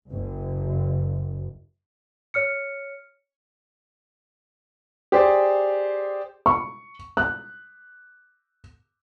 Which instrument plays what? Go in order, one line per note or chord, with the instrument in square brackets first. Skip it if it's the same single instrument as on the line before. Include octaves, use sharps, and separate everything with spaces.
[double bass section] F#1
[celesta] C#5 F6 C#7
[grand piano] G4 G#4 C5 D5
[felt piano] C#6
F#6